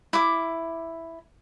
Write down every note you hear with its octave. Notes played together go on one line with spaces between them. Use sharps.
E4 D6